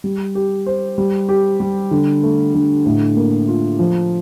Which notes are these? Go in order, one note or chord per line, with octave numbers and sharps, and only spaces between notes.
G3
G4
C5
G3
G4
G3
D3
A3
D3
A2
A#3
F4
F3